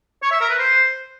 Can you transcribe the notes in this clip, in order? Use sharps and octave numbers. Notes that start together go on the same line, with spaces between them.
C#5
E5
A#4
B4
C5